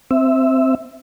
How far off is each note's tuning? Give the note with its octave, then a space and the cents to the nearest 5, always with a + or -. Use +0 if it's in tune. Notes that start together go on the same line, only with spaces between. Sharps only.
C4 +0 E5 +0